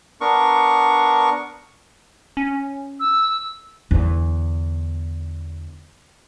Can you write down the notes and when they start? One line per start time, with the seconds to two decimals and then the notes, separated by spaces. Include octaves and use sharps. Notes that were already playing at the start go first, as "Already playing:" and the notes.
0.21 B3 D4 A#4 C#6
2.37 C#4
3.00 E6
3.91 E2 D3